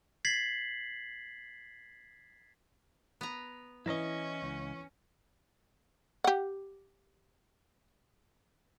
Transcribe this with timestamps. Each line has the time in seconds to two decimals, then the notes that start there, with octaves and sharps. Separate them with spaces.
0.25 G#6 A6 B6 C7 F#7
3.21 B3 A#5
3.86 E3 C#4 E4 B4 D#5 A#6
4.43 C#2
6.24 G4 F#5